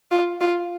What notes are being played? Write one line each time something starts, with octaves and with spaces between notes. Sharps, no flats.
F4
F4